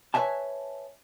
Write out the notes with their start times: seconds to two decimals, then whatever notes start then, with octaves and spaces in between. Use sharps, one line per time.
0.14 B4 C#5 E5 G#5 A5